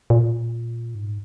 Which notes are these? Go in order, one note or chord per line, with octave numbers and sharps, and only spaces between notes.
A#2
G#2